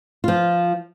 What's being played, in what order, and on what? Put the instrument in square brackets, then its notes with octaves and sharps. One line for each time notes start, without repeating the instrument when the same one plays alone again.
[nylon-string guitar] F3 F4